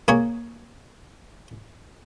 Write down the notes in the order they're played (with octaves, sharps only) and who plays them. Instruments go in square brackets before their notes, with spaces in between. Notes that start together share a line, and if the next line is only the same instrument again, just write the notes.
[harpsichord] A#3 G#4 C#5